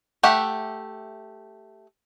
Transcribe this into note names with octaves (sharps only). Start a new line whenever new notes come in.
A3 G4 E5 F#5